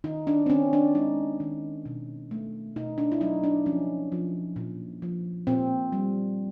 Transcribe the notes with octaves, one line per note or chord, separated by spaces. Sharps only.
D#3 D#4
D4
C4
D#3 C#4
D4
G#3 D#4
D#3
B2
A3
B2 D#4
D4
E4
F#3 D#4
D4
F3 C#4
F3
A#2
F3
A#2 C4
G3